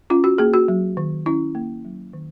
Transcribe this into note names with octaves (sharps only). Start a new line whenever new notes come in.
C#4 F4
F#4
A#3 G#4
F#4
F#3
D#3
C#4 E4
A#3
F#3
D#3